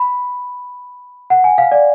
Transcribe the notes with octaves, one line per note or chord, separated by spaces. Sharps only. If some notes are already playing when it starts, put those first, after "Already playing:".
Already playing: B5
F#5
G#5
F5
D5